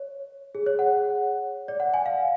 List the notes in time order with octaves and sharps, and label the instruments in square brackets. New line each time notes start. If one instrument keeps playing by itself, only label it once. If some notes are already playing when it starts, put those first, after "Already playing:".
Already playing: [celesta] C#5
G#4
C#5
F#5
D5
F#5
G#5
F5